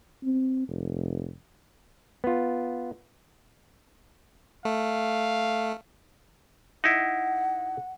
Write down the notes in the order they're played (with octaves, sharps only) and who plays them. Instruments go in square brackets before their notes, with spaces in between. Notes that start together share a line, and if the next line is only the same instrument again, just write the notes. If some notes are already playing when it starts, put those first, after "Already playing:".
[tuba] C4
F1
[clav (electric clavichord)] B3 F4
[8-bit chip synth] A3 [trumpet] F5
[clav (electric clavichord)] D#4 E4 [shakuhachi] F#5